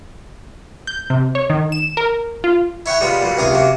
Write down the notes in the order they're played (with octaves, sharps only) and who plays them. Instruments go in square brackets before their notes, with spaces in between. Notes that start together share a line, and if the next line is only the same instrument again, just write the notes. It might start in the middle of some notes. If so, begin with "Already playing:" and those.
[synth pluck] G6
C3
C#5
D#3
E7
A#4
F4
[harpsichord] E4 C#5 F#5 G5
G3 G#3 B3 F4
A#2 F#3 G3
C#2 C3 G#4 F5 D#6
C3 F#3 A#3